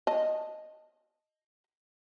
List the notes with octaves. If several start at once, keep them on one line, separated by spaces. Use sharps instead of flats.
D#5 A5